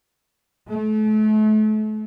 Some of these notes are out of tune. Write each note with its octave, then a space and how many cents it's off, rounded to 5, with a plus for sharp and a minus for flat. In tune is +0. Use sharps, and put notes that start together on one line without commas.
A3 -35